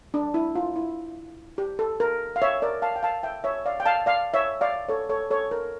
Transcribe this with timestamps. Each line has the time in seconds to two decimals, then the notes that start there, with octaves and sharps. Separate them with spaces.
0.14 D4
0.34 E4
0.55 F4
0.76 E4
1.58 G4
1.79 A4
2.00 A#4
2.36 F5
2.42 C#5 E5
2.62 A#4 D5
2.82 F5 A5
2.96 G5
3.03 F5 A5
3.23 E5 G5
3.44 C#5 E5
3.66 D5 F5
3.80 G5
3.86 F5 A5
4.06 D5 F5
4.34 C#5 E5
4.61 D5 F5
4.88 A4 C#5
5.09 A4 C#5
5.31 A4 C#5
5.51 A#4